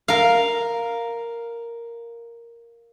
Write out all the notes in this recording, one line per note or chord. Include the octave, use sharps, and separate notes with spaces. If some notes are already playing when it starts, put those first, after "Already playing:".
A#4 F5